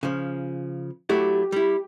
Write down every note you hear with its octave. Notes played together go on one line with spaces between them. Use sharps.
C#3 F3
F#3 A3 E4 G4
G3 E4